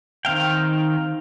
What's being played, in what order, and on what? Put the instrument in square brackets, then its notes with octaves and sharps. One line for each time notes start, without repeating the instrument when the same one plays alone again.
[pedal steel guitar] D#3 C4 F5 G5